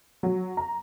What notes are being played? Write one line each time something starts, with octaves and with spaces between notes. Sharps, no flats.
F#3
A#5